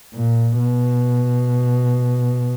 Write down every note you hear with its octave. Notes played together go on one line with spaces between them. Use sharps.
A#2
B2